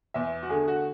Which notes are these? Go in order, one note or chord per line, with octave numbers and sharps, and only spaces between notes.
E2 E5
F#4
D3 A3 G#4
F#4